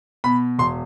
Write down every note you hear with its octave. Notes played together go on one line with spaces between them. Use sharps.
B2 B5
E1 C6